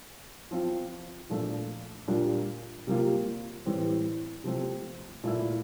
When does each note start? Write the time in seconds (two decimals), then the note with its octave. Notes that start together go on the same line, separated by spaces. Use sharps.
0.51 F3 C4 F4
1.30 A#2 F3 A3 D4 A4
2.08 A#2 G3 D4 F4 A#4
2.87 C3 G3 A#3 F4
3.66 A2 E3 G3 C4
4.44 C3 F3 A3 C4
5.24 A#2 A3 E4